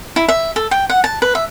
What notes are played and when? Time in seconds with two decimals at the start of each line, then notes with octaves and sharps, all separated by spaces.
0.16 E4
0.28 E5
0.56 A4
0.71 G5
0.90 F#5
1.04 A5
1.22 B4
1.35 E5